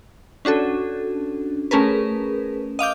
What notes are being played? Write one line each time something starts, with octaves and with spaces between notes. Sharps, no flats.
C#4 D4 F#4 A4
A3 C#4 G#4 A#4 B4
D#5 F5 D6 G6